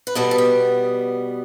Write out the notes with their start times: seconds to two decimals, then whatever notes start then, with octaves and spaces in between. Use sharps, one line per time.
0.07 B4
0.15 B2 G3 B3 A4
0.31 A4
0.38 G4